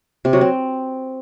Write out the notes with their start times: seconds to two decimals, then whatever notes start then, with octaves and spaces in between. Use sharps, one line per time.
0.25 C3
0.33 F#3
0.41 C4